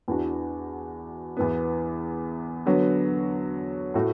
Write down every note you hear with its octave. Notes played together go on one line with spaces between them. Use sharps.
E2 E3 D4 F#4
E2 E3 B3
D3 F#3 B3 F#4
A2 A3 F#4